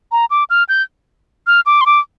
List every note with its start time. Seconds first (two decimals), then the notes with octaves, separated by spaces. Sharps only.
0.12 A#5
0.30 D6
0.50 F6
0.69 G6
1.47 F6
1.66 D6
1.81 C6
1.86 D6